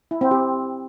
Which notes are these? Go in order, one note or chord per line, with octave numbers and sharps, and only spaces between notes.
E4
C4
G4